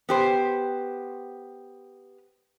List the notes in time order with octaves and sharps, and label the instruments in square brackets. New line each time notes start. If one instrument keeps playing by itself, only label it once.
[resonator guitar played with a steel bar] B3 G4 C5